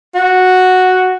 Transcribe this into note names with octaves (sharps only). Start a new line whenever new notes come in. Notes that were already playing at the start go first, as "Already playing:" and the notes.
F#4